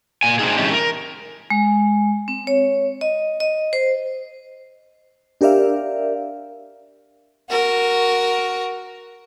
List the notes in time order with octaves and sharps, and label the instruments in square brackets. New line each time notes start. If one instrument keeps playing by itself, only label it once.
[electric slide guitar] A#2 G#5
C4 D4 D#4 G#4
E3 G#3 A3 C#4 D#4 G4
A#4
[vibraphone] G#3
C4
C#5
D#5
D#5
C5
[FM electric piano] D4 G4 A#4 D5 E5 F5
[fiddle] F#4 A#4